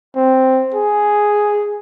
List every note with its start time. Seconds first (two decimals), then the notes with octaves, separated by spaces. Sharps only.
0.16 C4
0.74 G#4